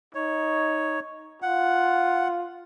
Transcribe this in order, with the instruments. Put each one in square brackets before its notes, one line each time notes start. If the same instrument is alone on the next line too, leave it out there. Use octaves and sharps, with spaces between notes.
[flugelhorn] D#4 [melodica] C#5
[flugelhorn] F4 [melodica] F#5